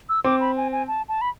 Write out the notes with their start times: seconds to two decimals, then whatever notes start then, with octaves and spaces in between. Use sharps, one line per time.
0.09 E6
0.24 C4 D6
0.41 B5
0.57 G#5
0.72 G#5
0.88 A5
1.09 A5
1.21 B5